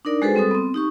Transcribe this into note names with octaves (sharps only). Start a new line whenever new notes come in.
D4 D#4 A#4 D5
G#3 F#4 G#4 A4 B4 C5
G3 C4 A4 D#6
B3 C4
D#4 G4 C#6